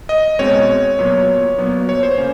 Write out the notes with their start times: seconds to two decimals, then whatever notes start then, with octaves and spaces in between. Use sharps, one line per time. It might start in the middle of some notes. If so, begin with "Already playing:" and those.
0.09 D#5
0.39 B2 G#3 C4 C#5
0.99 A#2 F#3 B3
1.58 A#2 F#3 B3
1.89 C#5
2.03 C5
2.18 C#3 A#3 C#4